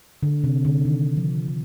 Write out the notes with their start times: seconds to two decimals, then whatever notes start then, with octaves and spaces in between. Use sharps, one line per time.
0.23 D3
0.44 C3
0.65 D3
0.85 D#3
1.17 F3
1.48 D3